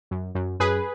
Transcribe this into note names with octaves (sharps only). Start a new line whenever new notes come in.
F#2
F#2
F#2 G#4 B4